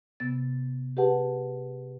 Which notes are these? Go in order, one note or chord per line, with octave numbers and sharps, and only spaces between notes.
C3 B3 A6
G4 G#4 B4 F#5 A5